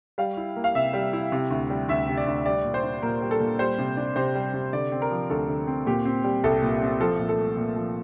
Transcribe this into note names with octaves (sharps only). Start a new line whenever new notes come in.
G3 F5
E4
A#3
F5
C3 E5
G3
E4
C3
D2
G3
D2 E5
C3
D5
D2
G3 D5
A#2
C5
D4
A#2 A#4
G3
A4
A#2
G3 C5
C3
D4
C3 C5
G3
C3
D3 D5
C4
A#4
F3
D2 A4
D3
C4
A#2 G4
C4
G3
C2 A4
A#2
C4
F3 A4
A#2
A4
A3
A#2
F3